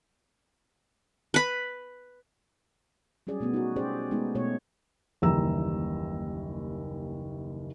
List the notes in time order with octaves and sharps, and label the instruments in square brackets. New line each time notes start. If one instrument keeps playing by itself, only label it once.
[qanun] B4 B5
[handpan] F#3 G3 C#4 G#4 D5
B2 A3 B3
D#4 F#4
C#4 G4 G#4 C5 D5
G#3 A3 B3 D#4
B2 A3 C#5
[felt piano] F#1 D#2 E3 G3 A#5 E6